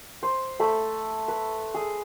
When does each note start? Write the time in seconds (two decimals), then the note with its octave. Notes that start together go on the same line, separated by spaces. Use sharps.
0.23 C5
0.60 A3 A4 B5
1.28 B4
1.74 G#4